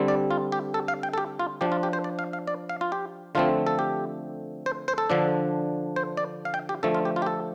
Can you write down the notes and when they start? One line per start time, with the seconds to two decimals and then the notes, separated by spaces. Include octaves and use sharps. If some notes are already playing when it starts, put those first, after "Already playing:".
Already playing: D3 G3 C4
0.08 D5
0.31 F4
0.52 G4
0.74 A4
0.88 F5
1.03 G5
1.13 A4
1.18 G4
1.39 F4
1.61 F3 D4 G4
1.72 F4
1.83 G4
1.93 C5
2.04 D5
2.19 F5
2.33 F5
2.47 D5
2.69 F5
2.81 F4
2.92 G4
3.35 D3 F3 A3 C4 F4
3.67 A4
3.79 G4
4.66 C5
4.88 C5
4.98 A4
5.10 D3 F3 D4
5.96 C5
6.17 D5
6.45 F5
6.54 G5
6.69 G4
6.83 D3 F3 A3 A4
6.95 F4
7.05 G4
7.16 F4
7.22 G4
7.26 A4